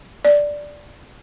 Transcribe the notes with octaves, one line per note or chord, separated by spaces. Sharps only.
D5